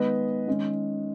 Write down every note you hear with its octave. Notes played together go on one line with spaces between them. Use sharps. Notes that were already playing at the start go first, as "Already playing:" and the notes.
Already playing: D#3 G#3 B3 B4 D#5
D#3 G#3 C#4